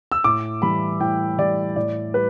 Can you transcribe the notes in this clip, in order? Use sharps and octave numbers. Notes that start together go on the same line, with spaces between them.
E6
A2 D6
E3 G3 B5
A2 G5
E3 G3 D5
A2 D5
G3 B4